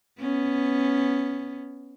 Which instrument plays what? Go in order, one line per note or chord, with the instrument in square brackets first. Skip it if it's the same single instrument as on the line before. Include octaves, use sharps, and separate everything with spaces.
[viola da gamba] B3 C#4